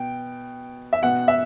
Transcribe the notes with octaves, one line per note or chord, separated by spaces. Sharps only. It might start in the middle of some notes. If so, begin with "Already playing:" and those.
Already playing: B2 G5
E5
B2 F#5
E5